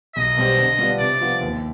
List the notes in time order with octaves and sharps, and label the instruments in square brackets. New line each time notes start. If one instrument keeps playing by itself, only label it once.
[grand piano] B1 [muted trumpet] D#5
[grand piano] B2 G3 C4 G4
D3
G3 B3 D4 F4
[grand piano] C3 [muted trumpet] D5
[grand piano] F3 B3 F4
D#2